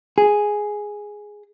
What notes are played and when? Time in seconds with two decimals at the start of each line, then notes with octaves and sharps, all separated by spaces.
0.18 G#4